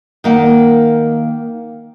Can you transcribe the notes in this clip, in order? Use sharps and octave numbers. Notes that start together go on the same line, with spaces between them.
D#3 A#3 F#5